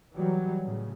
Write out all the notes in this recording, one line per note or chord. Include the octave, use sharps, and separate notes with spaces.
E3 F#3 G3
A2 C#3